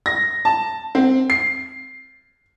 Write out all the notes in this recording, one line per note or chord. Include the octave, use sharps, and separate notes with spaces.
A#6
A5
C4
C7